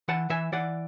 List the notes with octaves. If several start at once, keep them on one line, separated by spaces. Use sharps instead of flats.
E3 F#5 A5
E3 E5 G#5
E3 D5 F#5